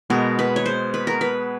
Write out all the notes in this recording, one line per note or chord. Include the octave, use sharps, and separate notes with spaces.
B2 G#3 B3 A#4
B4
C#5
C5
B4
A#4
B4